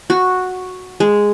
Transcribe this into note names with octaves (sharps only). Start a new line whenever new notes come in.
F#4
G#3